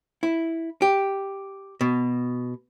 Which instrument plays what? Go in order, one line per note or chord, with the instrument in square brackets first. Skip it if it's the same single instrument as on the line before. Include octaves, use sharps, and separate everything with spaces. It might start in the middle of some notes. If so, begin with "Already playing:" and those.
[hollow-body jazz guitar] E4
G4
B2